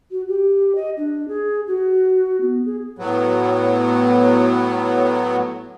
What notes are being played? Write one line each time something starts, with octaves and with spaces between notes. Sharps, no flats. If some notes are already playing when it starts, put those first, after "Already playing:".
F#4
G4
D#5
D4
G#4
F#4
B3
G#4
A2 F#3 B3